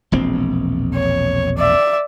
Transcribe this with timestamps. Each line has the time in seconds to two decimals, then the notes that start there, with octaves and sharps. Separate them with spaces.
0.12 E1 A#1 C4
0.95 C#5
1.58 D5 E5